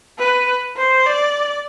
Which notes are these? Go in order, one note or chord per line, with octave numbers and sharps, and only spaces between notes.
B4
C5
D5